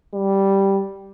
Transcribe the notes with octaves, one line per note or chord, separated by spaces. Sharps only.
G3